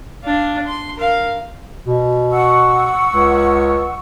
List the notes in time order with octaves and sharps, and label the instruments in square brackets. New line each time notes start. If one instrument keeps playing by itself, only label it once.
[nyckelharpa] D4 F5
C6
A#4 F5
[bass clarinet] B2
[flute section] F#5 C#6 E6
[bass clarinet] C#2